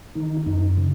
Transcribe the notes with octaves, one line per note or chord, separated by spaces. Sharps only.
D#3 D#4
F#2 D#4
C#3